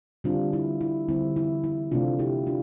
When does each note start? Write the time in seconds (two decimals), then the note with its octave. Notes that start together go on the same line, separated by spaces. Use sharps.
0.24 D3 G3 C4 D4 F4
0.53 E4
0.81 E4
1.09 D3 G3 C4 E4
1.36 E4
1.64 E4
1.91 C3 F3 A3 C4 D4 F4
2.19 E4 G4
2.47 D4 F4